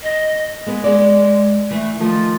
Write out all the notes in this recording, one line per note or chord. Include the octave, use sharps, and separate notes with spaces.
D#5
G#3 B3 B4
G#3 G#4 D5
E3 A3
D#3 F3 A3 F4